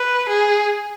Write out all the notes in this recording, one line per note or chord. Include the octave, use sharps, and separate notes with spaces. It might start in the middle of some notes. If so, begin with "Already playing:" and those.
Already playing: B4
G#4